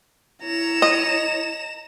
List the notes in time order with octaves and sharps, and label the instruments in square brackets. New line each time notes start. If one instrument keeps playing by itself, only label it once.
[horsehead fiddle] E4 C#5 [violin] A#5 E7
[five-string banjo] D#5